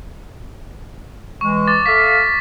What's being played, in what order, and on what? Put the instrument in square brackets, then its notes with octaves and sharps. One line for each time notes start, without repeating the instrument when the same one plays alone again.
[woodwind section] E3 G#3 [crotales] C#6
[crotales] D6 A6
[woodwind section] A4 E5 F5 [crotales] B6